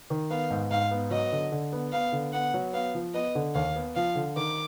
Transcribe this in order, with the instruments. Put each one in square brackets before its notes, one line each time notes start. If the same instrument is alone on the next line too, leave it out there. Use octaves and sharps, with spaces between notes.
[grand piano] D#3
[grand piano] B3 [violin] F5
[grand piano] G#2
[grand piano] G#2 [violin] F5
[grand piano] B3
[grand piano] F#3 [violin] D#5
[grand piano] D3
D3
B3
[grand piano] B3 [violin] F5
[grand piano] D3
[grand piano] B3 [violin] F#5
[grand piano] F#3
[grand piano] B3 [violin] F5
[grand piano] F3
[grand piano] B3 [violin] D#5
[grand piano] D3
[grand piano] D#2 [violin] F5
[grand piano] B3
[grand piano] F3 [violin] F5
[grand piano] D3
[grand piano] D#3 [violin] D6